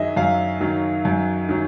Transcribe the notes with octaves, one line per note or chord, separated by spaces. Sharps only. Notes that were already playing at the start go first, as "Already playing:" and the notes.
Already playing: F#2 D#3 F#3 G#4 D#5 E5
F#2 F5
D#3 F#3
F#2
D#3 F#3